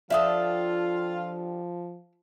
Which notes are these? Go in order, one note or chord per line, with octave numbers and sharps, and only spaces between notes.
F3 D4 F4 G4 A4 E5 F5 D#6